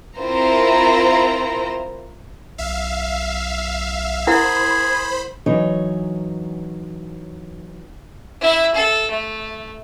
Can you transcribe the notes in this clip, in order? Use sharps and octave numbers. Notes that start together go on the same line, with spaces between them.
C4 E4 F4 A#4 C5 A#5
B1 E5 F5
E4 G#4 A#4 C5 F#5 B5
E3 F#3 D#4 C#5
E4 E5
A4
A3